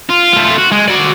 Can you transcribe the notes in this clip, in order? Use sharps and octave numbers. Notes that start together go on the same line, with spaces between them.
F4
A3 F4
F#4
G#3
F#4 D5